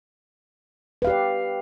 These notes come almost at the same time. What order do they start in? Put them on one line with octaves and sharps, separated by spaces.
B4 F5 G4 D5